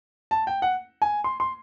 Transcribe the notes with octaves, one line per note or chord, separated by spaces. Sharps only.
A5
G5
F#5
G#5
C6
C6